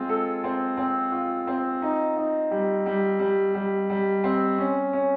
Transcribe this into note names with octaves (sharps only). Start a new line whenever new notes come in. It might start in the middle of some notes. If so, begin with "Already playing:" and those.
Already playing: G#3 C4 F4
A4
C4
C4
F4
C4
D#4
D#4
G3
G3
G3
G3
G3
C4
C#4
C#4